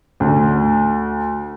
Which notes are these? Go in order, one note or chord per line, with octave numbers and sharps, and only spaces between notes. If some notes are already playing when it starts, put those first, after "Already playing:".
D2